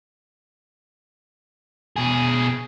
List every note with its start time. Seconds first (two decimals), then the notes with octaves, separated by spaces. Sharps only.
1.96 B2 G#4